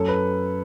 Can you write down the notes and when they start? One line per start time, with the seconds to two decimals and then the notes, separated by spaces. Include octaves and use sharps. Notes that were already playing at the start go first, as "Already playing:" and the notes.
Already playing: F#2 A4
0.08 B4